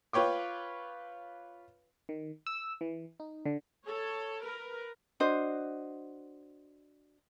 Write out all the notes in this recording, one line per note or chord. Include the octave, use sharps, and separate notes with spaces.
F4 B4 C#5 G5 D6
D#3
E6
E3
D#4
D3
A4 C#5
A#4 B4
D4 F#4 C5 D#5